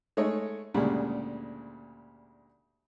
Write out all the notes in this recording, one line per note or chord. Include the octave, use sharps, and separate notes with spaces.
G#3 A3 D#4 C#5 D#5
D2 A#2 C#3 G3 G#3